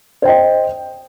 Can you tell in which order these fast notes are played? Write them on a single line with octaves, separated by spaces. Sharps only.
C5 G5 D#5